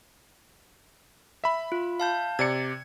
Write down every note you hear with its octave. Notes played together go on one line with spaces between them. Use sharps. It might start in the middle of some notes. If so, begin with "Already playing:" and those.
E5 B5
F4
F5 A5 G6
C3 D5 G#6 C#7